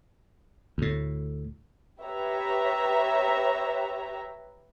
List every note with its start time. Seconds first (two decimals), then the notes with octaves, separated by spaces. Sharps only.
0.78 D2 A2
2.02 G4 B4 C#5 E5 A#5